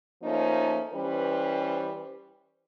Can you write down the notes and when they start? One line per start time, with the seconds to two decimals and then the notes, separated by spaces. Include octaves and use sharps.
0.23 F3 A3 A#3 C#4 D#4
0.93 E3 G3 C#4 B4 C5